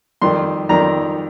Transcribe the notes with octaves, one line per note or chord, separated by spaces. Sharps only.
F2 D#3 G3 C6
F2 D#3 G3 A#5